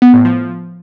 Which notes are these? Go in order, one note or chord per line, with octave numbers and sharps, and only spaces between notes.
B3
A2
F3